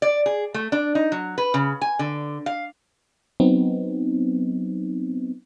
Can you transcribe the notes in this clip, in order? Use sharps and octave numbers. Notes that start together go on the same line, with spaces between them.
D5
G#4
A3
D4
D#4
F#3
B4
C#3
G#5
D3
F5
F#3 B3 C4 D#4